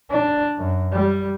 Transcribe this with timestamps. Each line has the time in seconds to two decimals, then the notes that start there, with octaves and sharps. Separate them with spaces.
0.10 D4
0.58 F#2
0.92 G3